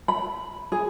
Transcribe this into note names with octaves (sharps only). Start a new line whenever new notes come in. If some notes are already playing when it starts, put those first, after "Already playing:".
B5
G#4